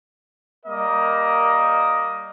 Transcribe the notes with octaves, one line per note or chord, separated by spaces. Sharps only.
G3 A#3 A#4 D#5